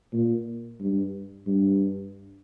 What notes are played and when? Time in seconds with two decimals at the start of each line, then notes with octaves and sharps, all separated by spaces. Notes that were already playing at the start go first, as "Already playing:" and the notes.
0.13 A#2
0.80 G2
1.47 G2